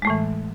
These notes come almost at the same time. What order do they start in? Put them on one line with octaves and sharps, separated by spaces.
G#3 A3 A2 E3